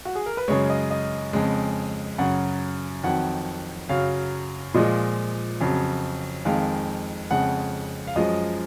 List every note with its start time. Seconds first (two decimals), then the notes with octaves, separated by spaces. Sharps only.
0.05 F#4
0.15 G#4
0.26 A#4
0.37 B4
0.48 F#2 C#3 G#3 C#5
0.70 D#5
0.90 D#5
1.33 F2 C#3 G#3
2.18 F#2 C#3 F#3 F#5
3.04 F2 D#3 F#3 F#5
3.89 F#2 C#3 F#3 F5
4.74 A#2 F3 G#3 D#5
5.61 F2 C#3 F#3
6.45 F2 D#3 G#3 F5
7.31 F2 C#3 G#3 F#5
8.07 F5
8.16 F#2 F3 G#3 D#5